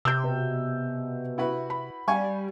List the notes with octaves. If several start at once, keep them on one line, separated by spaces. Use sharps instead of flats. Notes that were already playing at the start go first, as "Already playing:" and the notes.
C3 E6 G6
B2
E4 F#4 B4
B5
G3 F5 G#5 C#6